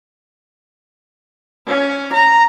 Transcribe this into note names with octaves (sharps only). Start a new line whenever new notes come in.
C#4
A#5